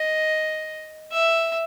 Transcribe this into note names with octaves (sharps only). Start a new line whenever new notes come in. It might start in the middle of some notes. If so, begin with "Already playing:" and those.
Already playing: D#5
E5